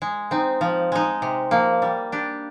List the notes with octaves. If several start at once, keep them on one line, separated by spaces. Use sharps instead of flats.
G#3
C4 D#4
F3
G#3 D#4
C3
F3 A#3
G3
D4 G4